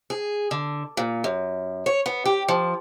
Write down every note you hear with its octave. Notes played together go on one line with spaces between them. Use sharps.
G#4
D3
A#2
F#2
C#5
B3
G4
F3